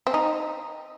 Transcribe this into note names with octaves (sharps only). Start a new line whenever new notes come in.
C4
D#4